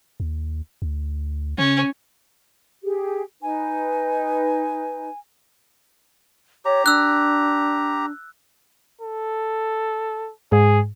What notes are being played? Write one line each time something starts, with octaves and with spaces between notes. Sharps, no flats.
D#2
D2
C#3 C#4
G4 G#4
D#4 B4 G#5
G4 C#5 A#5
D4 E6 F#6
A4
G#2 G#4